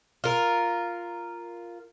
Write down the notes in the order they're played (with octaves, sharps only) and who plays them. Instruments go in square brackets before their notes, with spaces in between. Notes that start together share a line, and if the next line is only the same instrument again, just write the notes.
[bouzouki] F4 A#4